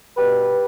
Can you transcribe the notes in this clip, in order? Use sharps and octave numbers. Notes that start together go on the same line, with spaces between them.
B2 G4 B4